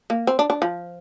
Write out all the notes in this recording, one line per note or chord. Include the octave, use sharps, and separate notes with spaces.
A#3
C4
D4
D4
F3